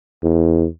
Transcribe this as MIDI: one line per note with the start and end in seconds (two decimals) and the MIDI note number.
0.23 0.66 40